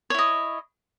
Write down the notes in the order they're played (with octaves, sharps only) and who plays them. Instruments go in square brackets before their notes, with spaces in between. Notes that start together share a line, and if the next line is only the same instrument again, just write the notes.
[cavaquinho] C#5
E4
D#5